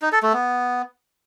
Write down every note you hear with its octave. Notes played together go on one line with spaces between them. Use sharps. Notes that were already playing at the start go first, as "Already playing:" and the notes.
D#4
A4
A3
B3